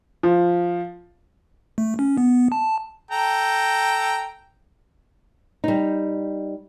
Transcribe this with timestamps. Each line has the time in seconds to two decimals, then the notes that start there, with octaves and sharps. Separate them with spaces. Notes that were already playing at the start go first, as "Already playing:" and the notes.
0.23 F3
1.78 A3
1.99 C#4
2.17 B3
2.52 A5
3.11 A4 G5 A#5
5.64 G3 D#4